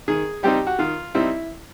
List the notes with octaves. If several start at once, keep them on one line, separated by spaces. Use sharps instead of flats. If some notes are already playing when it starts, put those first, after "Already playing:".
D#3 G#4
G3 C4 D#4 G4
F#4
D#3 F4
G3 C4 D#4 E4